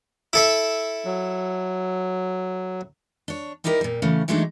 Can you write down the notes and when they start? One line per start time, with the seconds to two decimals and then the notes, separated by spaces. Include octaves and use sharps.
0.33 E4 A4 E5
1.05 F#3
3.28 D4 C#5
3.64 G3 D#4 E4 G4 A#4
3.81 A#2 G3
4.02 C#3 E3 A3 C#4
4.28 E3 F#3 G#3 A3 D4 D#4